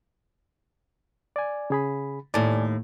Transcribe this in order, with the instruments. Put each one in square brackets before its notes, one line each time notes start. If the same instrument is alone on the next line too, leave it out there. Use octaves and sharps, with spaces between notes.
[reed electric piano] D5 G#5
C#3 G#4 B5
[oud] D#2 A2 [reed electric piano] D5 G#5 A5